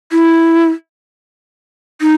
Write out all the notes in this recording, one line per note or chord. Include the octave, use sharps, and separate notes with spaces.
E4
D#4